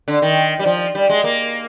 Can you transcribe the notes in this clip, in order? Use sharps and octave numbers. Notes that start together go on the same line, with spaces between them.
D3
D#3
G3
F3
G3
G#3
A#3